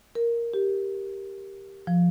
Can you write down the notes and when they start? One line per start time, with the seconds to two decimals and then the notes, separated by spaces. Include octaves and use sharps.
0.15 A#4
0.54 G4
1.87 F3